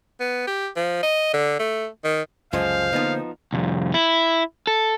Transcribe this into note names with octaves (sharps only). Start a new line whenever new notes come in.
B3
G4
F3
D#5
D3
A3
D#3
C#2 F#2 D3 F3 G#3 C5 F5
D3 F3 A#3 B3 D#4
C2 F2
E4
A4